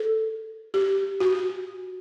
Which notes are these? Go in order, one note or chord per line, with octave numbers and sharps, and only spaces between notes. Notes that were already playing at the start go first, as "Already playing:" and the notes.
Already playing: A4
G4
F#4